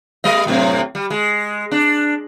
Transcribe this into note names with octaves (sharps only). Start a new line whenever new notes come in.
G3 D#5
F#2 A2 C3
G3
G#3
D4